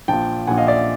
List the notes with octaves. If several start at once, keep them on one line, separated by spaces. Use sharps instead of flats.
A#1 A#2 G5 A5
A#1 A#2 F#5 G#5
D#5 F5
D5 E5